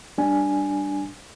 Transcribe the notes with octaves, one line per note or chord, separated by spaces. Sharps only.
G3 D4 G#5